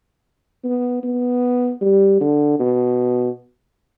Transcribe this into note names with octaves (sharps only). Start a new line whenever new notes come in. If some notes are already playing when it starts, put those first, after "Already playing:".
B3
B3
G3
D3
B2